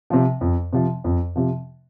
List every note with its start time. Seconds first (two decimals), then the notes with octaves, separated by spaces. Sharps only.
0.10 C3 F3
0.41 F2
0.73 C3 F3
1.04 F2
1.36 C3 F3